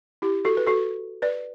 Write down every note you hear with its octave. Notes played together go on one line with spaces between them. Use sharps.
E4 G4
F#4 A4
B4
F#4 A4
B4 D5